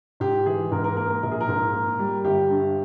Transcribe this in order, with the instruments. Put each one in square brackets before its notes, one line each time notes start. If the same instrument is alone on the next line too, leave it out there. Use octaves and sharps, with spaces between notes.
[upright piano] G#2 G4
E3 G#4
G#2 A#4
A#4
A#3 A#4
A#4
A#1 A#4
G#4
A#4
G#2
A#3
G3
G1 G4
G2